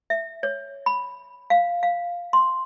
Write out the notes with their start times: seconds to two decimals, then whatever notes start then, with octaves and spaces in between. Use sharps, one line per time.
0.10 E5
0.43 C#5
0.86 B5
1.50 F5
1.83 F5
2.33 C6